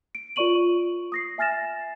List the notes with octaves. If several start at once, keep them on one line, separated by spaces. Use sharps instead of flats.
D7
F4 A#4 D5 C#6 D#7 F#7
D#6 A#6 C7
E5 G#5 F6 A6 A#6 E7